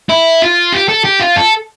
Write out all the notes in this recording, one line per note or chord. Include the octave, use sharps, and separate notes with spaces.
E4
F4
G4
A4
G4
F4
A4